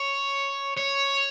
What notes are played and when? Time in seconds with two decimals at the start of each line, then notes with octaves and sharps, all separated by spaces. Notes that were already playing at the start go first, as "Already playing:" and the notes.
Already playing: C#5
0.77 C#5